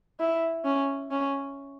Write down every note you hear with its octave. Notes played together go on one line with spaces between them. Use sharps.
E4
C#4
C#4